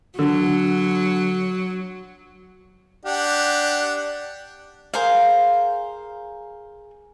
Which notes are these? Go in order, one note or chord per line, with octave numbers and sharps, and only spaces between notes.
D3 F#3
D4 G4 F#5
G#4 A#4 C5 F5